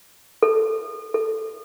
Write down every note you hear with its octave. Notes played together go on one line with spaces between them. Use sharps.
A4
A4